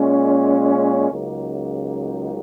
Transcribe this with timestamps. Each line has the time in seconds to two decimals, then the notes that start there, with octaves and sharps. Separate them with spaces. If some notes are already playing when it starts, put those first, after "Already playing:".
Already playing: A#2 G#3 C#4
1.11 C#2 C#3 F#3 A#3 D#4